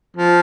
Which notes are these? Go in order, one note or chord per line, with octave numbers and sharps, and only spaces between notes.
F3